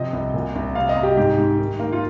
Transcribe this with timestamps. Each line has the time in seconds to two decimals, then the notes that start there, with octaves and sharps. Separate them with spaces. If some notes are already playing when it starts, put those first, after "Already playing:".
Already playing: C3 F3 D#5
0.13 C2
0.34 A#2
0.55 C2
0.75 C3 F5
0.89 D#5
0.97 C3
1.03 G4
1.17 G#2 G4
1.38 G#2
1.59 D#3
1.80 A#3
1.93 F4